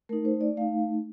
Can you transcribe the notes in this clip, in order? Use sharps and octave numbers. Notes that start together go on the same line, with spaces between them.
A3 D#4 A#4
C5
D5
A3 D#4 F5